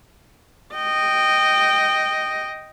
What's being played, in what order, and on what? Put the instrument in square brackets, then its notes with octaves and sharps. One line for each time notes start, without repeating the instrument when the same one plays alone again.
[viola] D#5 G5